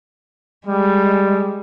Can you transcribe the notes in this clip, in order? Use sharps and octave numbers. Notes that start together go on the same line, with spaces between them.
G3 G#3